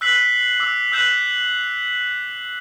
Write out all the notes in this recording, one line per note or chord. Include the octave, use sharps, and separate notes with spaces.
E6 F#6 B6 C7 F#7
D6 E6
E6 F#6 G6 B6 E7 F#7